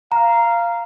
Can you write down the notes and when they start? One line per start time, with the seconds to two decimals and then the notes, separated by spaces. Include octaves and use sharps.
0.12 F5 A#5